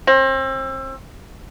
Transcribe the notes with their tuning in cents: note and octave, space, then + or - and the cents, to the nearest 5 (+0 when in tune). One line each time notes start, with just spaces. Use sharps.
C4 +35